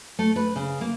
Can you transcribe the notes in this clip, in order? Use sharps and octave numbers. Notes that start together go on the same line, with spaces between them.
A3
B4
C#3
A#3